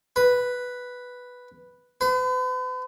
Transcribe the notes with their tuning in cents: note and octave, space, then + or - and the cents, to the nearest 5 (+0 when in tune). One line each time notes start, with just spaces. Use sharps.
B4 +0
B4 +45